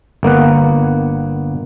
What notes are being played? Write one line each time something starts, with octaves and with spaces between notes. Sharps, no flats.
G1 A#3 B3 F#5